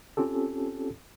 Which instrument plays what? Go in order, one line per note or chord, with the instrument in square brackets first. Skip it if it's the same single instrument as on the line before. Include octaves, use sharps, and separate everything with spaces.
[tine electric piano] C4 C#4 F4 G4 A4